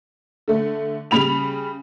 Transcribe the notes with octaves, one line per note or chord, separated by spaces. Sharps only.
D3 A3
C#3 G3 B5 F7